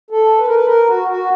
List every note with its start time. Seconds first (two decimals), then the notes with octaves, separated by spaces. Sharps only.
0.10 A4
0.38 B4
0.47 A#4
0.54 B4
0.66 A#4
0.87 F#4
1.08 F#4